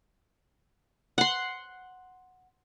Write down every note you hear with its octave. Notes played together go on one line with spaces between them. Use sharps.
F#5 C6